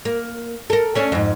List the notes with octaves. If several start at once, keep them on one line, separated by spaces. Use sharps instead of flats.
A#3
A4 A#4
A3 C#4 D4
F2 G#2